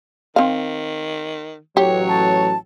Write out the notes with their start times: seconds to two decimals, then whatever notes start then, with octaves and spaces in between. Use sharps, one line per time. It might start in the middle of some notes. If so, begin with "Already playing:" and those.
0.36 D#3 C4 F5
1.77 A1 F#3 G4 C#5
2.08 A5